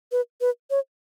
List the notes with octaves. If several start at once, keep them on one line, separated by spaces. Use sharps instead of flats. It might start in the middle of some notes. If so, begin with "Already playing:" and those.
B4
B4
C#5